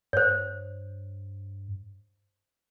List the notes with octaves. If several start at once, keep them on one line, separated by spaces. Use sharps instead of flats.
G2 C5 C#5